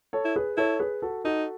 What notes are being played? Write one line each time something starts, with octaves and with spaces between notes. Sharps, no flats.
A4 C#5
E4
G#4 B4
E4 A4 C#5
G#4 B4
F#4 A4
D#4 F#4 A4